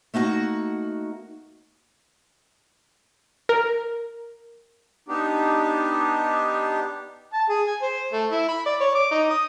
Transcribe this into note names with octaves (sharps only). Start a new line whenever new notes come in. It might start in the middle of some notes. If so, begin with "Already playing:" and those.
A3 A#3 D#4 F#4
A#4
B3 D4 D#4 G4
A5
G#4
G#5
C5
A3
E4
B5
D5
C#5
D6
D#4
D#6